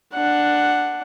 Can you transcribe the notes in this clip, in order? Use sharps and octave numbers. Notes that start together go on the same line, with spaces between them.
D4 F#5